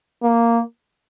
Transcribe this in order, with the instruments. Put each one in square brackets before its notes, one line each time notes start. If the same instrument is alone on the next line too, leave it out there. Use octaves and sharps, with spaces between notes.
[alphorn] A#3